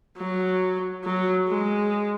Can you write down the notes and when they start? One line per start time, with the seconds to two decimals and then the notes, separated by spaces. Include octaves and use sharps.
0.17 F#3
1.04 F#3
1.48 G#3